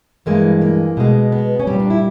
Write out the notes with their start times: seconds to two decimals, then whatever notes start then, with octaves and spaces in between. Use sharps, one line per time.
0.26 G2 E3 G#3 A#3
0.61 A#3
0.97 B2 G#3
1.32 B3
1.60 C#4
1.67 A#2 G3 C4
1.80 D4
1.90 E4